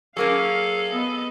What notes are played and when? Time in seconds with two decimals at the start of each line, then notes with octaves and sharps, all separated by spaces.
0.17 F#3 A#3 C#4 G#4 A4 F5
0.92 B3 D#5